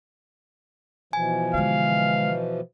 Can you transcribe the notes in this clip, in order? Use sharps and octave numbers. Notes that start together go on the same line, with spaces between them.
B2 E3 F3 G#5
D3 G#3 F5